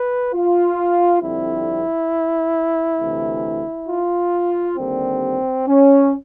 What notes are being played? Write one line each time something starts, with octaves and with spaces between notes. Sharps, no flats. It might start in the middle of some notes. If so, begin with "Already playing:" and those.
Already playing: B4
F4
F2 D3 G3 C4 E4
D2 C3 E3 A3
F4
D#2 D3 G3 A#3 C4
C#4